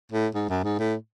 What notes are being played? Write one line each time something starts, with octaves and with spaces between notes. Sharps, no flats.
A2
G#2
F#2
G#2
A2